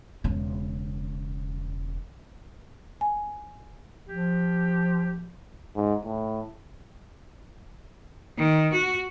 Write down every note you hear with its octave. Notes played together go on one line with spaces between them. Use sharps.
E1 C#3
G#5
F3 G4
G#2
A2
D#3
F#4